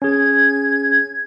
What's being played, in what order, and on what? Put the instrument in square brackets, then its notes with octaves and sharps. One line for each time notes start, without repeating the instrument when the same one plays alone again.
[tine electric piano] C#4 G#4 [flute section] G#6